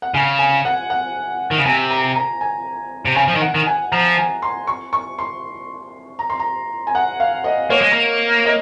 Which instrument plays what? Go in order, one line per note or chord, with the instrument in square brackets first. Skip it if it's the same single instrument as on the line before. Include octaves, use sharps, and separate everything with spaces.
[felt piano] F#5
[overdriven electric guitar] C#3 [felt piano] G#5
[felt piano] G#5
F#5
F#5
[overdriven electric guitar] D#3
C#3
[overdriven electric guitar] C3 [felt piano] G#5
[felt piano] A#5
A#5
G#5
[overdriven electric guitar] C3
[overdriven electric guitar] C#3 [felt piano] G#5
[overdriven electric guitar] F3
D#3
[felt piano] F#5
[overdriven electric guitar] D#3
[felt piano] G#5
[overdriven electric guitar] F3 [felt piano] A#5
[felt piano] G#5
C6
C#6
C#6
C6
A#5
C6
A#5
G#5
F#5
F5
D#5
[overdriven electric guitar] A#3 [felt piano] C#5
[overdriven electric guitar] G#3
A#3
[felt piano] D#5